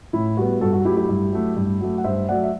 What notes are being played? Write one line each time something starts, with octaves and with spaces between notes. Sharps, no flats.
A2 E4
G3 B3 F#4
G2 F#4 A4
F#4
F#3 A3 E4 G4
E4 G4
G2
F#3 A3
G2
F#3 A3
F#5
G2 C5 E5
F#3 A3 D5 F#5
E5